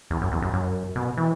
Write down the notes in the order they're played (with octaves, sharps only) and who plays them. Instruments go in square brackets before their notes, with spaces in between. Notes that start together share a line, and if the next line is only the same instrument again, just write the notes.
[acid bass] E2
F#2
E2
F#2
F#2
B2
E3